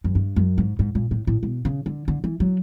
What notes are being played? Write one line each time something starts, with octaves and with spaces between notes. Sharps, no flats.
F#2
G2
F#2
G#2
G#2
A#2
A2
A2
B2
C#3
D3
D3
E3
F#3